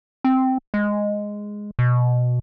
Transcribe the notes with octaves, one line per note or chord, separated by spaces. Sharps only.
C4
G#3
B2